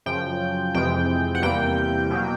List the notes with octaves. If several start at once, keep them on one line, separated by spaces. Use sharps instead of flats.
F#2 C#3 F3 G5
F2 C3 E3 G#3 G5
F#5
E2 C3 E3 G3 A#3 G5
B2 F#3 A#3